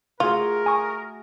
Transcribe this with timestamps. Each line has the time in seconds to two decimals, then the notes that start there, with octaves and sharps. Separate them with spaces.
0.20 A3 F4 F#4 G#4 A#4
0.66 G#5 C#6 D#6